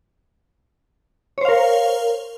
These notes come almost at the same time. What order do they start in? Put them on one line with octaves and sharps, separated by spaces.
C#5 C5 F5 A#4